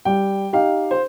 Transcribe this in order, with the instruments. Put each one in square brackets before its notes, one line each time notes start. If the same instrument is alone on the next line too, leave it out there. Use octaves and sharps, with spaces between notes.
[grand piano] G3 [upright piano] G5
[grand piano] D#4 G4 [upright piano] F5
[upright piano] C5